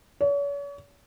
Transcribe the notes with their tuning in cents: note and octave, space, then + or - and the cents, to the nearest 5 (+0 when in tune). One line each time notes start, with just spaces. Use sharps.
C#5 +40